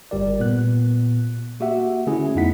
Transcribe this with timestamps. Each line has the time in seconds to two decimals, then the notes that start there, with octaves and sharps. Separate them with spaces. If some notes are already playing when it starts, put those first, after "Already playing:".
0.11 G1 G3 G4 A#4 D5
0.39 A#2 B3 F#6
1.60 A#3 F#4 G4 E5 F#5
2.07 D3 A3 C#4 E4 G#4
2.35 F2 B3 D#4 E4 F#5 B6